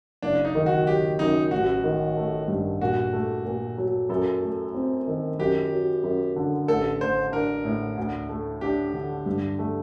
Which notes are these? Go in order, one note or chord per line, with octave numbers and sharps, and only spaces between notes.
F#1 D4
D#4
D#3
F#4
F#3 G4
F#2 D#4
A1 F#4
D#3
A3
G2
A#2 F#4
A3
A#2
F#3
F#2 A4
A3
C4
D#3
F#2 G4
F#3
F#2
D3
A1 A4
A3 C5
D4 A#4
A2
D2
A3
D4 G4
D3
G2
A3